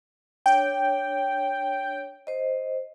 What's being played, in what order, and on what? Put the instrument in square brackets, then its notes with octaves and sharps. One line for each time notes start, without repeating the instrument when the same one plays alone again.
[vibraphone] D4 C#5 [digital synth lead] G5
[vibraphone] C5 D#5